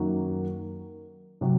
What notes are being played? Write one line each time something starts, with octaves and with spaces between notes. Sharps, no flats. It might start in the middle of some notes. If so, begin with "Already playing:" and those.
Already playing: F#2 D#3 F#3 A#3
C3 F#3